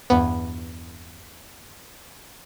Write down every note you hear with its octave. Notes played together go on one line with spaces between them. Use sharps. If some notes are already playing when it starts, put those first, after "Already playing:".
E2 G2 B3